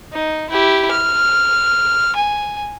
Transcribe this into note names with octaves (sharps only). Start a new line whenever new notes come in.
D#4
E4 G4
F6
G#5